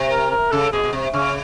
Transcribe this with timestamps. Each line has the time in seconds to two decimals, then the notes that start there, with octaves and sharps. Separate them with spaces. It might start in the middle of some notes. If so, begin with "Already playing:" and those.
Already playing: C3
0.10 A#4
0.31 A#4
0.51 C#3 A4
0.72 B2 G#4
0.84 B2
0.93 C3
1.13 C#3 C#4